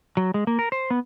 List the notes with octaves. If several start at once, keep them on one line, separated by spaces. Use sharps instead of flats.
F#3
G#3
A#3
A#4
C5
B3